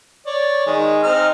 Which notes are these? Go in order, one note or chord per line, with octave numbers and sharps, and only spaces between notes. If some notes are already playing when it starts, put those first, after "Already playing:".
C#5 D5
D#3 G#3
C4 D#4 F6